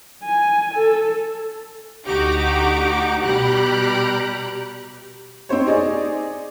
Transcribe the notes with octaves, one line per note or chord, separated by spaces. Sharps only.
G#5
A4
D2 D#4 F#4 G4 A#5 D6
B2 G3 G4 A#5 B5 F#6
C4 D#4 C5 C#5
D#4 G#4 D5 D#5